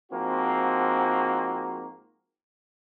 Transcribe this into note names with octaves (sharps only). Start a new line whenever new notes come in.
G#2 F3 A#3 C4 F#4